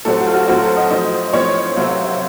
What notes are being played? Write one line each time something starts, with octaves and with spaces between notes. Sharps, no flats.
A2 F#3 C4 A4
F#4
F4
F#4
A2 F#3 C4 F#4
A4
D#5
A2 F3 C4 D#5
A2 F3 C4 C#5
C#2 C3 F#3 A3 C4